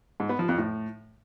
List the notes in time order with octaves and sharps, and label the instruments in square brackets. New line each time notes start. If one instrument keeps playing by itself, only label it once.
[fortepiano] G#2
B3
F3
F2
A2